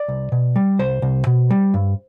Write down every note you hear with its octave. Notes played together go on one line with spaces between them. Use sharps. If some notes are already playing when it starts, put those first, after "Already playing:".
Already playing: D5
C2
B2
G3
C2 C5
C2
B2
G3
G2